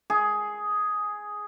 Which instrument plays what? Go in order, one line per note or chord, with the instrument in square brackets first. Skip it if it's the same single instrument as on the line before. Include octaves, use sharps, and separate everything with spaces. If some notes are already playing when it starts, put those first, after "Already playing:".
[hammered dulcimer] G#4